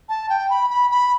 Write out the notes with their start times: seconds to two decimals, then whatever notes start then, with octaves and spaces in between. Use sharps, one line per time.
0.09 A5
0.29 G5
0.50 B5
0.70 B5
0.91 B5